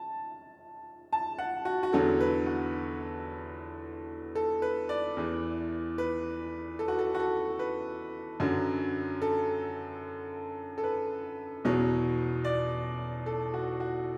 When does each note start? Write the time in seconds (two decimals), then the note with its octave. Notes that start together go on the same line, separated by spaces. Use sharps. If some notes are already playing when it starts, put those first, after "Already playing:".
Already playing: A5
1.13 A5
1.38 F#5
1.65 F#4
1.83 F#4
1.92 E2 D3 F#3 A4
2.20 B4
2.46 F#4
4.35 A4
4.62 B4
4.89 D5
5.17 E2 E3
5.98 B4
6.79 A4
6.88 F#4
6.99 A4
7.15 F#4
7.20 A4
7.59 B4
8.40 F#2 D3 F#3
9.22 A4
10.78 A4
10.83 B4
11.65 E2 B2 F#3
12.45 D5
13.26 A4
13.54 F#4
13.80 F#4